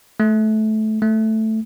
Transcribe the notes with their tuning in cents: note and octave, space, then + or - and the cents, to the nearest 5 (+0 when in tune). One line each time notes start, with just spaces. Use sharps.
A3 -20
A3 +0